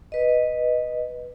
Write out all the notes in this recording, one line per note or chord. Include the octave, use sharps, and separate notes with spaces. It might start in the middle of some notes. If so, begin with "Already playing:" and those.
B4 D#5